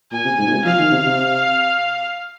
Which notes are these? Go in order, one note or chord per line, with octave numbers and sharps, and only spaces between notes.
A#2 G#5
C3
G#2
A#2
C3
F3 F5
D#3
C3
C3